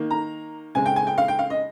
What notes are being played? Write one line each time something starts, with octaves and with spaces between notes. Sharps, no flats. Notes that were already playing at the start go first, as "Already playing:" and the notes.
Already playing: D#3 A#3
A#5
C#3 G#3 C4 G#5
G5
G#5
G5
F5
G5
F5
D#5